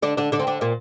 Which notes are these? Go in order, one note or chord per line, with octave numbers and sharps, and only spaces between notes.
D3 D4
D3 D4
D3 D4
C4
D3 D4
A#2 A#3